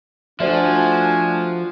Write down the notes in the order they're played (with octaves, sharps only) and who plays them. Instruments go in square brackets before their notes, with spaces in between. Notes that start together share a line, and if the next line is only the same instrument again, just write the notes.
[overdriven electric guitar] F3 [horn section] A3 F#4 G#5 [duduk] D4 [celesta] C5 D5 E5